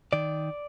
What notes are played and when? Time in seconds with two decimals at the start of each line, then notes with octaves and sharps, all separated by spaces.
0.13 D#3 D5